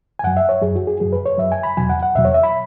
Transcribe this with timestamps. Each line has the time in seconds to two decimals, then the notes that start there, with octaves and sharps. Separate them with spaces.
0.19 G#5
0.23 F#2 F#3 F#5
0.37 E5
0.49 C#5
0.62 F#2 F#3 G#4
0.76 F#4
0.87 G#4
1.00 F#2 F#3 G#4
1.13 B4
1.26 C#5
1.38 F#2 F#3 E5
1.52 G#5
1.63 B5
1.77 E2 B2 F#3 G#5
1.89 F#5
2.03 F#5
2.16 E2 B2 F#3 E5
2.25 C#5
2.34 E5
2.43 B5